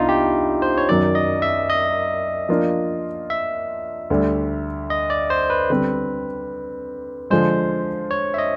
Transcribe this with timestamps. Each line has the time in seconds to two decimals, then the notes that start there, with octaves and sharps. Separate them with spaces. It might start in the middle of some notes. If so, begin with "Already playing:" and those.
Already playing: C2 B3 D4 D#4 F4
0.09 G4
0.62 C5
0.78 C#5
0.89 F#2 D#3 F#3 D5
1.15 D#5
1.42 E5
1.70 D#5
2.49 F3 A#3 D4 F4
3.30 E5
4.10 D2 D3 G3
4.90 D#5
5.10 D5
5.30 C5
5.50 B4
5.70 D3 G3 C4
7.30 D3 F3 G#3 C5
8.11 C#5
8.34 E5
8.38 D#5